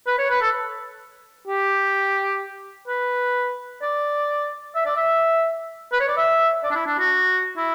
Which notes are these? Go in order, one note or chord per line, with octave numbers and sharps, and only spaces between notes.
B4
C#5
B4
A4
G4
B4
D5
E5
D5
E5
B4
C#5
D5
E5
D5
D4
E4
D4
F#4
E4